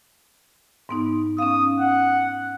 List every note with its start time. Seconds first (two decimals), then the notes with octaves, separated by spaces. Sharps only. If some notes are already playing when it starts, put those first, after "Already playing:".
0.89 G#2 B3 D#4
1.38 C#4 F5 D#6
1.80 F#5